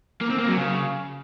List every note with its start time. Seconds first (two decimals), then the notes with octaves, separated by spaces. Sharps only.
0.21 A#3
0.30 C4
0.39 A#3
0.48 F#3
0.57 C#3